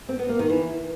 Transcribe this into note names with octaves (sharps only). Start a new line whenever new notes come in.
C4
B3
A#3
D#3
E3